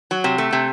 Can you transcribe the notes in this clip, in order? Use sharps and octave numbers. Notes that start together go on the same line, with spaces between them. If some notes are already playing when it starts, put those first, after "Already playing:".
F#3
C3
A3
C3